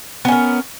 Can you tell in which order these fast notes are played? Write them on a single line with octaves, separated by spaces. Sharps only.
B3 C#4 A#4